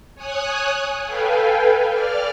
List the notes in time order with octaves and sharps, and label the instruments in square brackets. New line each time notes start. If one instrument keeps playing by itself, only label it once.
[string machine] C#5 G#5 D#6 F#6
A4 B4 F5 G5 G#5
D5 F6